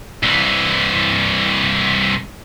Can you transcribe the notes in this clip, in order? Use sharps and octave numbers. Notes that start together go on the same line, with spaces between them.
C2 E3